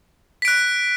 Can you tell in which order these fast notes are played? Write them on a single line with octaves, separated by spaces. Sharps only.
B6 D7 F#6